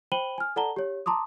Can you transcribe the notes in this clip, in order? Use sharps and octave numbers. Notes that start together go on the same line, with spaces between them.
C5 G5 B5 D#7 F#7 G7
G#5 F6
A4 D5 F#5 A5 A#5 G7
G4 C#5
A5 A#5 C6 D6 D#6